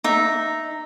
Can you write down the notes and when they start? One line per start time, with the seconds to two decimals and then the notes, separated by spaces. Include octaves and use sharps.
0.04 D#4 E5